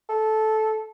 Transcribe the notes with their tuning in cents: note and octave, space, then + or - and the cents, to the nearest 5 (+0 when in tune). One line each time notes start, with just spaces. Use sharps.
A4 -15